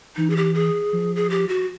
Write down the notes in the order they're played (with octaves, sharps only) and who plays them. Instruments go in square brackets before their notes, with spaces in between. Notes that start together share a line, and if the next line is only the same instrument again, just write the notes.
[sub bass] E3 [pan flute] D#4
[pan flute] G#4
G4
G#4
[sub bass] F3
[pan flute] G#4
G4
F#4